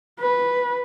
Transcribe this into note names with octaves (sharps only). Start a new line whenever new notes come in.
B4